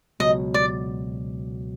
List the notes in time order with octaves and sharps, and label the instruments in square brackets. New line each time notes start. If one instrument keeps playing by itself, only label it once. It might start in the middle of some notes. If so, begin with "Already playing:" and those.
[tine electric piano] C#2 B2 F#3 [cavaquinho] D#5
[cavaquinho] D5